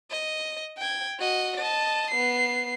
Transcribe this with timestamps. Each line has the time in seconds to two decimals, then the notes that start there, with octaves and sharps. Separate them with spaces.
0.11 D#5
0.77 G5 G#6
1.19 F#4 D#5
1.57 D#5 A5
2.10 B3 C7